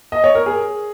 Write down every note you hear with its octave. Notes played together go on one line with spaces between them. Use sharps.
D#5
C#5
A#4
G#4